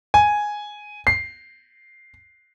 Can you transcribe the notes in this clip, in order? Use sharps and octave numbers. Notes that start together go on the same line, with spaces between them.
G#5
C7